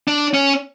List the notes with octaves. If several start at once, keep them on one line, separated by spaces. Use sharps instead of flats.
D4
C#4